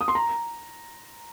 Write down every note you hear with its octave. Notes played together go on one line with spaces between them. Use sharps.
D#6
C6
A#5